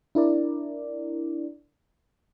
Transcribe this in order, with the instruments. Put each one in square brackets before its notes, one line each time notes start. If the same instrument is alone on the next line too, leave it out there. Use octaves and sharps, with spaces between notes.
[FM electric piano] D4 E4 A#4 D5